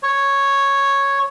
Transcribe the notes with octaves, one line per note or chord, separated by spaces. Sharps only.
C#5